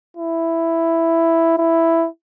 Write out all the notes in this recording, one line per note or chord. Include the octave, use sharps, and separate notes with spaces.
E4
E4